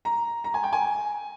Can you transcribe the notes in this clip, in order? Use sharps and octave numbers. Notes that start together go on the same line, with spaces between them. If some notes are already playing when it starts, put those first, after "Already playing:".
A#5
A#5
G#5
G5
G#5